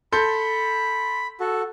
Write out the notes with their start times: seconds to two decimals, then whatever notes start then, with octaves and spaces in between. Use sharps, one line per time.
0.13 A4 B5 C6 G6
1.40 F#4 A4